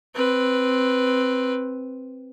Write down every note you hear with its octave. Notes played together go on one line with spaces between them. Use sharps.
C4 B4